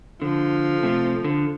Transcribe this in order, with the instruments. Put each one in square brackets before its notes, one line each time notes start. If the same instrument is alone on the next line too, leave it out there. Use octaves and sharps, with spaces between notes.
[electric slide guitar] D3 [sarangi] F3
[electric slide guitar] C3 A3
D3